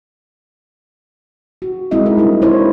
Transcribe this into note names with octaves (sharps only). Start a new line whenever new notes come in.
F#4
G#3 C4 E4 D#5 E5
D#4 A#4
G3 D4 E4
D4 E4 F4 C5 C#5